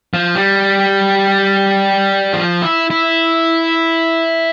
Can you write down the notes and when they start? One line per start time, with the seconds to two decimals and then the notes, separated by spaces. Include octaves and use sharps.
0.14 F3
0.35 G3
2.33 F3
2.62 E4
2.90 E4